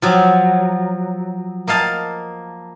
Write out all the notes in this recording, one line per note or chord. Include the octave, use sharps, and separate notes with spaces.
F3 F#3
A#3 D#5 F5 A5